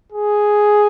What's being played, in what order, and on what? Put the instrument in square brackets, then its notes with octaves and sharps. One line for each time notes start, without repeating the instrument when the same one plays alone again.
[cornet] G#4